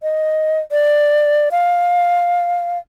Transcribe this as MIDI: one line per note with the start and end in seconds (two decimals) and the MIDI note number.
0.02 0.60 75
0.71 1.49 74
1.51 2.78 77